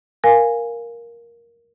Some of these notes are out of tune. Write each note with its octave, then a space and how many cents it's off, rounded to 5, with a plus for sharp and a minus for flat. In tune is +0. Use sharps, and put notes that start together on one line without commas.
A#4 +10 F5 +0 G#5 -10